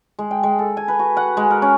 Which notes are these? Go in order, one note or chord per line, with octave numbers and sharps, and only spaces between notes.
G#3
G5
G#3
A4
G#5
B4
F#4
F#5
G#3
A#4
C#4